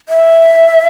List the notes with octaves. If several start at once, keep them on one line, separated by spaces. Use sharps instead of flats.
E5